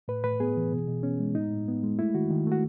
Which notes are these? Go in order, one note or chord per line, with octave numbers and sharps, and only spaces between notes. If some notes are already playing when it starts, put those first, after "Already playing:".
A2 B4
A2 B4
B3 G#4
E3
B2
B2
B3 C#4
G#3
A2 D#4
A2
B3
G#3
A3 E4
D#3 F#4
D#3
A3 F#4